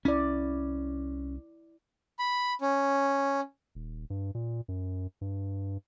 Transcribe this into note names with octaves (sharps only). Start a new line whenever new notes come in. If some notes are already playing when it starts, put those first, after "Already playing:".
C2 C#4 E4 D5
B5
C#4
D#1
G2
A#2
F#2
G2